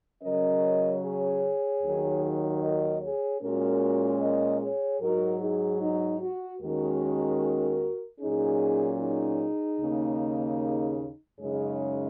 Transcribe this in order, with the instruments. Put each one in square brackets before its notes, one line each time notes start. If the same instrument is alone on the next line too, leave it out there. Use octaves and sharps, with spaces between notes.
[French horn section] C#3 F#3 C#4 A#4 D#5
G#4 C#5
D#2 D#3 F#3
A#4 D#5
G#4 C#5
A#2 G#3 C#4 F#4 A#4
A#4 D#5
G#4 C#5
G#2 F#3 D#4 F#4 A#4
D#4 G#4
D#4
F#4
D#2 D#3 G#3 C#4 F#4 A#4
A#2 F#3 C#4 D#4 G#4
D#4 G#4
D#2 C#3 A#3
F#2 C#3 G#3 D#4 G#4 C#5